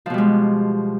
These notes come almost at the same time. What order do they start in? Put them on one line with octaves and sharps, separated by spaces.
F3 B2 G3 G#3